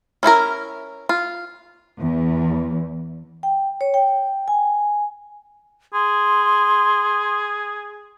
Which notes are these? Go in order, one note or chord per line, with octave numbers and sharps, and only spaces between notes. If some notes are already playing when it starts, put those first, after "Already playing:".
C#4 E4 F4 A#4
F4
E2
G5
C#5
G5
G#5
G#4 C6